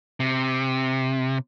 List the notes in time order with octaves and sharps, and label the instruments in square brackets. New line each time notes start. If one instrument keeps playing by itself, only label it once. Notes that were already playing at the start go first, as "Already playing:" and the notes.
[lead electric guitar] C3